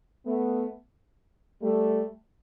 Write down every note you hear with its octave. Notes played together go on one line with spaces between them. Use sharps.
A3 B3
G3 A3